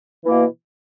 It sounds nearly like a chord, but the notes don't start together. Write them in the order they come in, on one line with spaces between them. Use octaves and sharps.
E3 A#3 B2